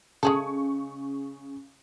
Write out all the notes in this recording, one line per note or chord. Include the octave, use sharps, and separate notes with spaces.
C#3 G#3 G#4 A4 C#6